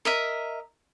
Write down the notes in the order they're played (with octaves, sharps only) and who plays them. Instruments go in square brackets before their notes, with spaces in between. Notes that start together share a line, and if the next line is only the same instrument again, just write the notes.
[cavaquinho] A#4 D#5 E5